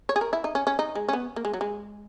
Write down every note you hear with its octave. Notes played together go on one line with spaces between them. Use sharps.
C#5
G#4
A#4
E4
D#4
C#4
C#4
D#4
G#3
C#4
B3
A#3
G#3
F#3
G#3